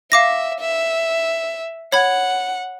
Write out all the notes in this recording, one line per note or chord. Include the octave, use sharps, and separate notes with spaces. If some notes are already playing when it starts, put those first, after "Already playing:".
E5 F5 D6 A#6
E5
C#5 F#5 B5 G#6